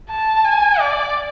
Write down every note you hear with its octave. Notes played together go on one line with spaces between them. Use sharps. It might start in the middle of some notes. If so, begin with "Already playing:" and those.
A5
G#5
D5